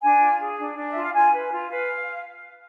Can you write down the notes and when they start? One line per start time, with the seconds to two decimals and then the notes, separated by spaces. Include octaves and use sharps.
0.01 D4 G#5
0.20 F4
0.38 G#4
0.57 D4
0.76 D4
0.90 F4 E5
1.02 F5
1.13 F4 G#5
1.32 B4
1.51 F4
1.69 B4 F5